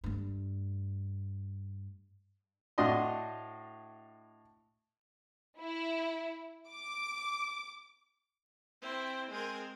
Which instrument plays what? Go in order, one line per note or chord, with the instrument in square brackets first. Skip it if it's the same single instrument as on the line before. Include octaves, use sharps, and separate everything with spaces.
[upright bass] G2 A3
[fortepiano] A2 D4 F#4 D#5 C6
[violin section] E4
D6
[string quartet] C4 E4 C5 G5
G#3 C4 G#4 A#4